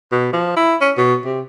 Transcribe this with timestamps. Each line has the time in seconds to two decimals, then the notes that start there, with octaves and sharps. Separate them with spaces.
0.12 B2
0.33 F3
0.56 E4
0.81 C#4
0.97 B2
1.25 C3